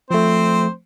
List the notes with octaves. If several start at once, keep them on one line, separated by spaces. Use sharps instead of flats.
F3 A3 C4 C5